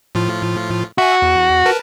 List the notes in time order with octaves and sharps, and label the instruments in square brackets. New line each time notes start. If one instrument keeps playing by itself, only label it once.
[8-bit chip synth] A2 F3 F4
[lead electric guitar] F#4 [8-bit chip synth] E5 G#5
[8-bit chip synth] E2
A#4 B4 A5